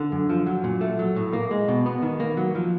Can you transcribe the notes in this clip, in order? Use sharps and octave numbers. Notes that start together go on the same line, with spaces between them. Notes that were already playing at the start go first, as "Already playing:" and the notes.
Already playing: D3
F#2
F3
F#3
A#2
A3
F#3
A2
A#3
G#3
B2
B3
D#3
A#3
F#3
F3